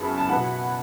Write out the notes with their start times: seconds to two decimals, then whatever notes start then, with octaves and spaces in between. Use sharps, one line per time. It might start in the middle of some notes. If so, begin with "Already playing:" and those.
Already playing: F#2 C#3 B3 E4 A5
0.18 A5
0.29 B2 B3 E4 F#5